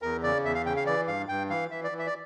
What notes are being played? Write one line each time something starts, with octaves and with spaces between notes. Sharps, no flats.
E2 A#4
C#3 D5
E2 E5
F5
C#3 G5
F5
E3 D5
G2 F5
G2 G5
E3 F5
E3 E5
D5
E3
E5
D5